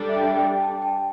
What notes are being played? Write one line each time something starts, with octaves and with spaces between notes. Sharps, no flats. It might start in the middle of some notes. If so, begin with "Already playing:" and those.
Already playing: G3 D4 A4 D5
E5
G5
E5
G5
A5
G5